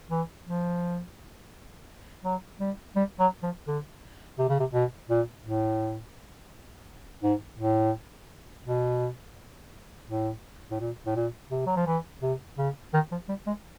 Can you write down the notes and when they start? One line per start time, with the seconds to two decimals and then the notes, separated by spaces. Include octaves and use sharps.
0.11 E3
0.47 F3
2.25 F#3
2.60 G3
2.96 G3
3.20 F#3
3.43 F3
3.68 D3
4.39 C3
4.49 C#3
4.60 C3
4.74 B2
5.10 A#2
5.45 A2
7.23 G#2
7.59 A2
8.66 B2
10.09 A2
10.71 A2
10.80 A#2
11.07 A2
11.16 A#2
11.51 C3
11.67 F#3
11.76 F3
11.87 E3
12.22 C3
12.58 C#3
12.94 D#3
13.11 F3
13.29 G3
13.47 G#3